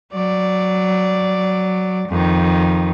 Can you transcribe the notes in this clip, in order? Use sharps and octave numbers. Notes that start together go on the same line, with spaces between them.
F#3 D5
F2 D#3